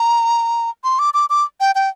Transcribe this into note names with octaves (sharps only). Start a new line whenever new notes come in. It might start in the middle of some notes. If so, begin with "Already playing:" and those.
Already playing: A#5
C6
D6
D6
D6
G5
G5